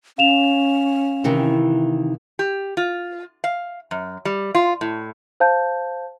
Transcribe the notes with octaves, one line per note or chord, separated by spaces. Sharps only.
C#4 F5 E7 F7
C3 D#3 E3
G4
F4
F5
F#2
G3
F4
A2
C5 F5 A5 G6